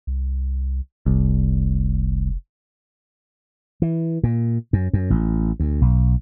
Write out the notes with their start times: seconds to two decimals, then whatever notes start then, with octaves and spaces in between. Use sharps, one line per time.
0.07 C2
1.06 F1 C2
3.82 E3
4.23 A#2
4.73 F#2
4.93 F#2
5.10 A1
5.60 D2
5.81 B1